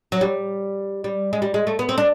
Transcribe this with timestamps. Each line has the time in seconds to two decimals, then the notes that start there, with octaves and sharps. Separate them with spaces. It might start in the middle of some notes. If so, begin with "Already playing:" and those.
0.12 F#3
0.21 G3
1.04 G3
1.33 G#3
1.42 G3
1.54 G#3
1.67 A3
1.79 B3
1.89 C4
1.98 D4